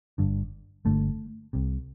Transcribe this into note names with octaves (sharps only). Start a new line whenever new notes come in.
G1 G2 D3
G1 G2 D3 A3
C2 C3